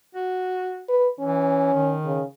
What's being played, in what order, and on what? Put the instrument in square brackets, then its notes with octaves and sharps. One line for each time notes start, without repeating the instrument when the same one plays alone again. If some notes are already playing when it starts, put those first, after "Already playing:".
[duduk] F#4
[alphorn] B4
[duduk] E3 [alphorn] C#4
[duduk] D#3
[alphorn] C#3